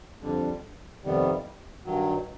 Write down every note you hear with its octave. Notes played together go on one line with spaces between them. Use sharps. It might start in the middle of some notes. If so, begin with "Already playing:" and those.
F2 D3 G3
F2 C3 D#3 G3 B3
G2 D#3 F#3